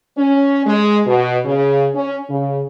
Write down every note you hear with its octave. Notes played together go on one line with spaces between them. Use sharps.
C#4
G#3
B2
C#3
C#4
C#3